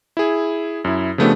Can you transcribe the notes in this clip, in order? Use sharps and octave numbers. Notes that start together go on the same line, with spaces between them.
E4 G#4
F#2 E4
C#3 F3 A3 B3 D4 G4